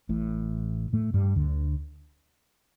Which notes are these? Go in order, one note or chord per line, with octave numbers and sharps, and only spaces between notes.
A1 A2
A2 A3
G2 G3
D2 D3